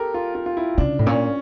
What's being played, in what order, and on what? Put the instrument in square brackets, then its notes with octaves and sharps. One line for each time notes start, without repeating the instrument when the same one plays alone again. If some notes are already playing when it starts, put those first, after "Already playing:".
Already playing: [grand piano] G4 A4 A#4
F4
F4
F4
E4
[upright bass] C#3 [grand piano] D4
[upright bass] A2
[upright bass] A#2 [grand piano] C#4